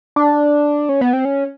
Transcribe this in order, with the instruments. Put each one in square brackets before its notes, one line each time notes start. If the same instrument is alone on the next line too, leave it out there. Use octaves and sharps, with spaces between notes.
[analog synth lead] D4
C#4
B3
C4
C#4